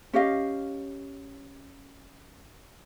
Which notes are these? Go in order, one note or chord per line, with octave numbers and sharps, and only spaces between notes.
C#4 G4 D#5 F5